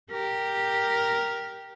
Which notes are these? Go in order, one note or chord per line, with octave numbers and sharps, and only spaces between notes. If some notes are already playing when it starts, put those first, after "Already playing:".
G4 A#4